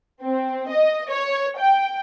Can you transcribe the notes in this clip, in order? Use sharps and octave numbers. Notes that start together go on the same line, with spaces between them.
C4
D#5
C#5
G5